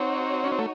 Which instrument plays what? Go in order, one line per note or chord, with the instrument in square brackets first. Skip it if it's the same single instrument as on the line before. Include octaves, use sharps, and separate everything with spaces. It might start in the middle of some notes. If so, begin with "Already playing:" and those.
Already playing: [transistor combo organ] C4 [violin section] D#4 F#4 C#5
[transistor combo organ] C#4
C4
A3